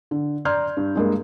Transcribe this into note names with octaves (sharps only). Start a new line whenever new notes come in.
D3
D5 A#5 C6 F6 G6 G#6
G2
G2 G#3 A#3